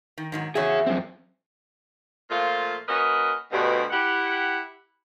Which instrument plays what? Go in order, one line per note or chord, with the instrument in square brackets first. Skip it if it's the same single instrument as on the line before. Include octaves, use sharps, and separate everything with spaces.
[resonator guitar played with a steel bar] D#3
G#2 D#3 F#3
[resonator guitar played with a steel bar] E2 F#4 E5 [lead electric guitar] G#4 C#5
[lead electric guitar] F#2 C4
[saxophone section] A#2 F3 A3 F4
A#3 C#4 F#4 A#4 B4 D#5
D2 G2 B2
E4 G4 F#5